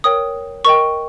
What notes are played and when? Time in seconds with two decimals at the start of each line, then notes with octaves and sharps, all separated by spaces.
0.04 A#4 C#5 G5 D#6
0.65 A#4 D#5 G5 C#6